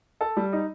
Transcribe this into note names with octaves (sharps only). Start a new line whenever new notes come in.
A4
G3
D#4